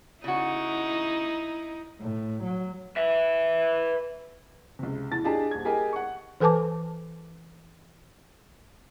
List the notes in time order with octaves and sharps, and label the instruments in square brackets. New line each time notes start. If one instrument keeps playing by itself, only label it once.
[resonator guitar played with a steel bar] C#3 F#4 [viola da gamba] D#4 E4
[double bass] A2
F#3
[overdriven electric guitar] B4 E5
[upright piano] C#2 C3
E2 A2 A5 A6
D4 F4 G4 G#4 D#5 A5
D#1 G#6
G4 G#4 A#4 D#5 G5 G#5
F#5 C#6
[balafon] E3 A4 B4 G#5 A5 D6